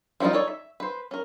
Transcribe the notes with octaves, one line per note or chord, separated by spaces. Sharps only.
F3 G3 C4 D#4 F4
D#4 A4 C#5 D5
E5
B4 C5
C#4 A#4